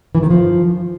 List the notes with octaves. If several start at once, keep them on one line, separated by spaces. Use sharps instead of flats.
E3
D#3
F3